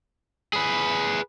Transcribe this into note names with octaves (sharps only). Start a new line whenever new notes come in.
G#4 B4